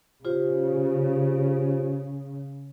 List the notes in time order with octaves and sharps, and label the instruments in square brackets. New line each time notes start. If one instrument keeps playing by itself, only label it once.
[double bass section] C#3 [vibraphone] F4 G4 C5